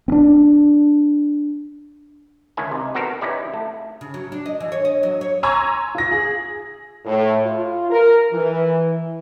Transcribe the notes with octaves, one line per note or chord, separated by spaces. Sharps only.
C4 D4
C#2 D#3 E4 G#5
C3 D#4
B3 F#4 A4 A#4 C5
C#4 D#4 E4 G4 B4 D5
A3
C#3
F#3
D4
D#5
E3
C#5
D#5
F#3
C#5
G#5 A#5 C6 C#6 E6 G#6
F4 A#6
G#4
A2
F4
A#4
E3